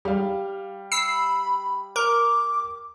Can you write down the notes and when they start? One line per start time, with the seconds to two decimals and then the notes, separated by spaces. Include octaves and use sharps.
0.05 G3 F5
0.92 B5 E6 C7
1.96 A#4 D6